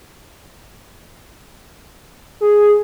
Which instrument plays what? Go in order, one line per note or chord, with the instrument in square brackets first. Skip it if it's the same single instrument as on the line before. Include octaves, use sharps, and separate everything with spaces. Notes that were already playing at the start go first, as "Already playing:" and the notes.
[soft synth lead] G#4